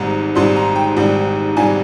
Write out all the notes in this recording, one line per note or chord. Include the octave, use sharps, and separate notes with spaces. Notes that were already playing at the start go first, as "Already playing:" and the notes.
Already playing: G#1 G#2 G3 A#5
G#1 G#2 G3 C6
A#5
G5
G#1 G#2 G3
G#1 G#2 G3 G#5